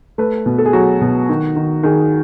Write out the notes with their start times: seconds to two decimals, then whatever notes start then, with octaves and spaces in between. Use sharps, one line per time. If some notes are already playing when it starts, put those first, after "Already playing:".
0.18 A3 B4
0.46 B2
0.58 A4
0.66 G#4
0.73 F#3 F#4
1.01 B2
1.29 D#3
1.56 D#3
1.83 D#3 G#4